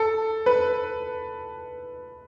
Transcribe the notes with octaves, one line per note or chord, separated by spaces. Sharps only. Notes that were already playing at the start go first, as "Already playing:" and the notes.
Already playing: A4
B4